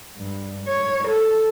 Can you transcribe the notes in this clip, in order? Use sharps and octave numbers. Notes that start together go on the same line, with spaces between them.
G2
C#5
A4